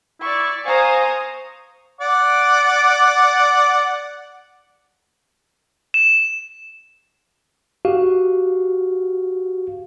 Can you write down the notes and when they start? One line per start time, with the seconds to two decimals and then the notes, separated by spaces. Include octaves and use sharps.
0.21 E4 D5 C#6
0.65 C5 F5 G#5 A#5 C#6 D#6
2.01 D5 F#5 D6
5.94 E7
7.85 F#4 G4 F5